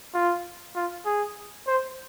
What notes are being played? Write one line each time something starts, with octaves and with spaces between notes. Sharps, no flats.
F4
F4
G#4
C5